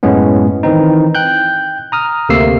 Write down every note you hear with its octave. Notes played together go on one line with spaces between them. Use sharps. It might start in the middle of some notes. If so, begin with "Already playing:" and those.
F#2 A2 G#3 B3 C#4
D#3 E3 C4 D#4
G5 F#6 G6
A#5 D#6 F6
D2 C3 A3 A#3 E6 C7